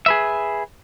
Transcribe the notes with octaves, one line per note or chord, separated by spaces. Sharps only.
G#4 B4 E5